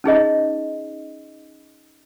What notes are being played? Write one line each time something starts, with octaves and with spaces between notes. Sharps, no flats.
C#4 D#4 G#4 D#5